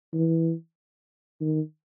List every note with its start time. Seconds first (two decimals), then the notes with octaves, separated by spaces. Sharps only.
0.14 E3
1.41 D#3